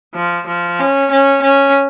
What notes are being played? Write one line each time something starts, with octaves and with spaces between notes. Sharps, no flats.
F3
F3
C#4
C#4
C#4